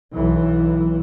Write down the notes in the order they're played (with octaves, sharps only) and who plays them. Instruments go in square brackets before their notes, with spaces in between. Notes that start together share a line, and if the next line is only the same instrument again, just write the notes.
[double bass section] B1 E3